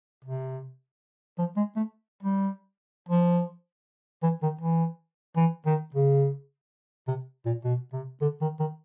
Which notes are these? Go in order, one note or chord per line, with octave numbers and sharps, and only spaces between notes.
C3
F3
G#3
A3
G3
F3
E3
D#3
E3
E3
D#3
C#3
C3
A#2
B2
C3
D3
D#3
D#3